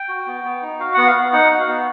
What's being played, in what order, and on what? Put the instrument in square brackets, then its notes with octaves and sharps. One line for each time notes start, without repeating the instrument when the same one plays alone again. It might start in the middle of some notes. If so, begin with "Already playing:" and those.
Already playing: [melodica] G5
F#4
B3
B3
D#4
F#4 F5
B3 F#5
F5
B3
D#4 F#5
F#4
F5
B3